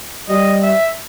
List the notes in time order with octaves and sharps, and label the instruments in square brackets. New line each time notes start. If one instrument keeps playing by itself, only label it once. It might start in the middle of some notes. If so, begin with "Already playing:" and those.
[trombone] G3 [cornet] D#5
[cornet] E5